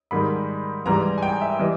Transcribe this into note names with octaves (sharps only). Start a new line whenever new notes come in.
G#2 D#3 G3 B5
G#2 E3 G3 A#5
G#5
G5
E5
E3 G3 D#5